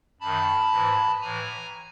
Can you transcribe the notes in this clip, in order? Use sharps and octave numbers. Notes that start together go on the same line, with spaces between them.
F#2 D#3 A5 B5
G#2 E3
A2 E3 G#5 A#5